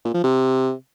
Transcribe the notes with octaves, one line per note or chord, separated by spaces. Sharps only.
A#2
F3
C3